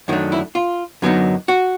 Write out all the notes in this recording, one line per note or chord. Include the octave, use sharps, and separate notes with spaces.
F#2 D#3 F#3 A3 D4 E4
E4
F4
F#2 D3 F#3 B3 D#4
F#4